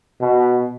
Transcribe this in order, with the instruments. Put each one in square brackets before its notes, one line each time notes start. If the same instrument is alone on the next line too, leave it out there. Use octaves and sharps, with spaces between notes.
[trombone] B2